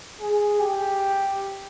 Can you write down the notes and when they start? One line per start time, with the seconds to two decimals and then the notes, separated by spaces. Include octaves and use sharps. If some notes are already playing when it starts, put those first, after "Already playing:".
0.21 G#4
0.60 G4